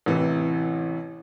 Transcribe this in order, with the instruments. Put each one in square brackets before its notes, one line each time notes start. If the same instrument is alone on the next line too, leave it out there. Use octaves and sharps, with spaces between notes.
[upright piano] A1 C3 E3